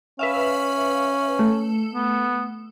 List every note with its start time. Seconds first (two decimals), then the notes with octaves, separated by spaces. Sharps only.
0.19 C#4 B4 E5 F5
1.39 A3
1.94 B3